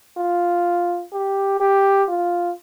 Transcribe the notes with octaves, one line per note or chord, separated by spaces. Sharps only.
F4
G4
G4
F4